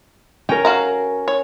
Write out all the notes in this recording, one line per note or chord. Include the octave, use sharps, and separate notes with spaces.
C#4 A#4 G5
F#4 F5 A#5
C#5